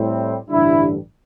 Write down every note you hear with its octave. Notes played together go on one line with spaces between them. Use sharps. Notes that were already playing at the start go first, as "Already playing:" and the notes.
Already playing: A2 G3 C4
A1 G2 D3 G3 D4 E4